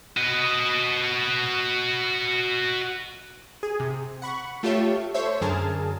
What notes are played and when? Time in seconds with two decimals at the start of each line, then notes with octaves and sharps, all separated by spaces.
0.17 F#4 D#5
3.63 G#4
3.80 C3
4.22 F#5 B5 C#6
4.63 A3 F4 G4 A4 C#5 E5
5.14 A4 C5 C#5 E5
5.41 F#2 D3 G#4 A#4 A5